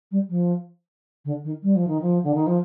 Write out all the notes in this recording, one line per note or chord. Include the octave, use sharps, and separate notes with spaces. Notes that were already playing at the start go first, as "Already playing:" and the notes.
G3
F3
D3
D#3
G3
F3
D#3
F3
D3
D#3
F3